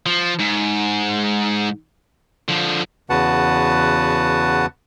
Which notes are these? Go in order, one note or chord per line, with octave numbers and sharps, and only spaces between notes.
F3
G#2
D3 F3
E2 C#3 F#4 B4 F#5 A5